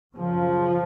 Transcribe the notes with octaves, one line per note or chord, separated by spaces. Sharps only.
F#2 C#3 F3